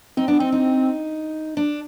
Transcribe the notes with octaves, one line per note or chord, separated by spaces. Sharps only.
C4 D#4
B3 D4
C4 D#4
D#4
D4